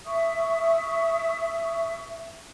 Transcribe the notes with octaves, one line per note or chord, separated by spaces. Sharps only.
E5 C#6 D#6